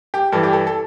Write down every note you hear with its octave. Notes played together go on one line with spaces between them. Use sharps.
G4
G2 E3 A4
G4
A4
A4